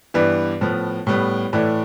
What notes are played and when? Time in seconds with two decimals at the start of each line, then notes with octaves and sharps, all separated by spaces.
0.14 G2 E3 B3 B4 D5
0.61 A2 F3 B3
1.07 A2 G3 B3
1.53 A2 E3 A3 B4 D5